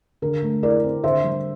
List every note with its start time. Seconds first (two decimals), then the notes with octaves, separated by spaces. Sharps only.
0.22 D3 A#4
0.42 A3
0.63 E4 A#4 D5
0.83 C4
1.04 D3 C5 E5
1.24 G3